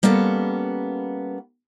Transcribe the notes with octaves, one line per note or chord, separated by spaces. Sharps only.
G3 A#3 B3 C#4 A4